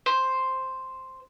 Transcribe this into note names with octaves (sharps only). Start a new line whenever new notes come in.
C5